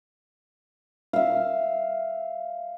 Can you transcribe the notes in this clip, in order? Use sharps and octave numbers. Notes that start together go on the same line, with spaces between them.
E5 F5